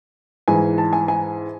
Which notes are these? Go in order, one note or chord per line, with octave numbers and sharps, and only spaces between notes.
G#2 E3 G#5
A5
G#5
G#5